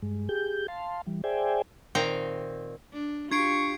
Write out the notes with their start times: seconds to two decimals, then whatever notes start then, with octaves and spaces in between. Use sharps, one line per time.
0.02 G2 G#3
0.29 G4 G#4 G6
0.68 F5 A5 C6
1.06 E3 G3
1.24 G#4 C5 D5 E5 G5 G#5
1.95 A#2 D#3 C4 G5 A#5
2.93 D4
3.31 D4 F4 G4 C#6 G#6 C7 D7